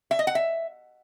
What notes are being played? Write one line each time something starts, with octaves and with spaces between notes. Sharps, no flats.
E5
D#5
F#5
E5